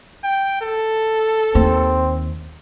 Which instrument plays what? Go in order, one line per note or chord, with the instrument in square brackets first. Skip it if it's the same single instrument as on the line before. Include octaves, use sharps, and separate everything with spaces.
[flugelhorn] G5
A4
[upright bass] D#2 A#3 [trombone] C4